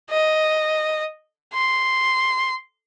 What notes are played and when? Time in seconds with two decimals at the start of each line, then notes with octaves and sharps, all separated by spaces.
0.10 D#5
1.53 C6